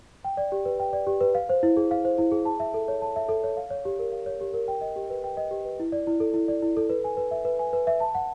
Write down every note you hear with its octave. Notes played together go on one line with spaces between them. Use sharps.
G5
D5
G4
B4
G5
D5
G4
B4
F5
C5
E4
G#4
F5
C5
E4
G#4
A5
E5
A4
C#5
A5
E5
A4
C#5
F5
C#5
G4
A#4
F5
C#5
G4
A#4
G5
D#5
G4
B4
G5
D#5
G4
B4
E4
D5
E4
A4
E4
D5
E4
A4
B4
G#5
B4
E5
B4
G#5
B4
E5
A5
F#5